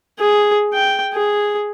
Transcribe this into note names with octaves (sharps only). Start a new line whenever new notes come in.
G#4
G5
G#4